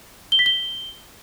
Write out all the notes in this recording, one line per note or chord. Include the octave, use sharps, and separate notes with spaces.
G7
B6
G7